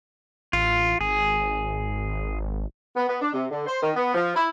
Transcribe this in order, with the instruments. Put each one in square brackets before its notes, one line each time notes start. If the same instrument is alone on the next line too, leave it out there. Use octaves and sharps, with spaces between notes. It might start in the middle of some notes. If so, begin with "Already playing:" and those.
[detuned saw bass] A1 [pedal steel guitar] F4
[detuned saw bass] G#1 [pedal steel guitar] G#4
[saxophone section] B3
B3
D4
C3
D3
C5
D#3
B3
F3
E4